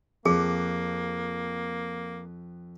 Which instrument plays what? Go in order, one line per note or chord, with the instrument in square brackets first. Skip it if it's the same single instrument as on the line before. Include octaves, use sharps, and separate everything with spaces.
[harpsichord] F2 [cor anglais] A#3 [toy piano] G#4